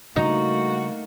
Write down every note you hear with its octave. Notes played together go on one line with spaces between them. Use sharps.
C#3 G3 A3 A#3 D#4 F#4